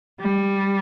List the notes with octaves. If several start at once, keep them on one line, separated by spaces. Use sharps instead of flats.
G3